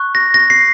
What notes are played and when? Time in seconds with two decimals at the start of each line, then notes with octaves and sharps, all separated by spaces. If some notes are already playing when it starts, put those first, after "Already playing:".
Already playing: C#6 F#6
0.15 A#6
0.34 A#6
0.50 C7